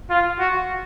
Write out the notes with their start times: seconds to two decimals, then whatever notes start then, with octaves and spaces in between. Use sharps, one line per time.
0.10 F4
0.39 F#4